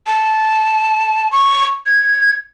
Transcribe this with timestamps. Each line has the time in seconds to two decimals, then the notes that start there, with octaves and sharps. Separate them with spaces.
0.07 A5
1.32 C#6
1.86 G#6